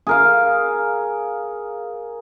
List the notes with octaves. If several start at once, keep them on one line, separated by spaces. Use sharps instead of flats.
G#4 A#4 F5